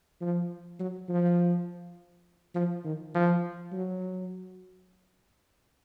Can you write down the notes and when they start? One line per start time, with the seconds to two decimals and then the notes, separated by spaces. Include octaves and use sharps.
0.21 F3
0.79 F#3
1.09 F3
2.55 F3
2.84 D#3
3.15 F3
3.72 F#3